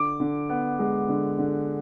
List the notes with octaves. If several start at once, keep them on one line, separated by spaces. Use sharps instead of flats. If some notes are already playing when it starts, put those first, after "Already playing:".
Already playing: D3 D6
D3
B3
G#3
D3
D3